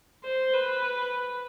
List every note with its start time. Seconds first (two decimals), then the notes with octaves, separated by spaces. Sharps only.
0.24 C5
0.53 B4